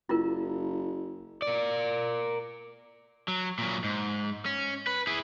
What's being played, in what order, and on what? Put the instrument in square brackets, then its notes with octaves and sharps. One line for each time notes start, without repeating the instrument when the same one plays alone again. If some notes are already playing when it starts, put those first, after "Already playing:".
[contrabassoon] F#1 [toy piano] E4 F4 A#4
[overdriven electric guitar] A#4 D5
F#3
A#2 F#3
G#2
C#4
B4
E4 G#4